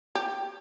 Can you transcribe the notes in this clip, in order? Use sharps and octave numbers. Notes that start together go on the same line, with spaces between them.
G4